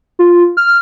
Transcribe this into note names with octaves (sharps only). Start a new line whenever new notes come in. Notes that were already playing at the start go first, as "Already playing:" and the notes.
F4
F6